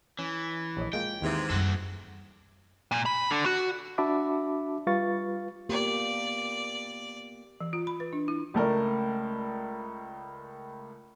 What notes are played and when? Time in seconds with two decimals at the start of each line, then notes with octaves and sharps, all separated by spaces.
0.19 E3 C#4
0.77 A#1 E4 C#5 D#5
0.93 G#3 A#3 F4 G5
1.22 D#2 G#2 C3 E3 E5
1.50 F#2 G3 F#4 A4
2.91 A#2
3.06 B5
3.31 D3
3.46 F#4
3.98 D4 F#4 E5 A5 B5 D6
4.87 G3 F4 B4 F5 C#6 A6
5.69 A#3 B3 G4 D5
7.61 E3
7.73 F4
7.87 B5
8.00 B4
8.13 D4
8.28 E4
8.54 C#2 A3 A#4 D5